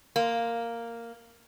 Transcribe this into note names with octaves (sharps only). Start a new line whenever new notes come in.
A#3